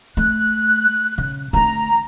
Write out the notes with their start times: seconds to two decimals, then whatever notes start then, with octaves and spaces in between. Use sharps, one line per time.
0.17 A3 F#6
1.18 C#3
1.53 D3 A3 A#5